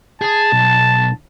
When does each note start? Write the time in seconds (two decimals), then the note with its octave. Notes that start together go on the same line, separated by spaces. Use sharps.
0.22 G#4 A5
0.53 B1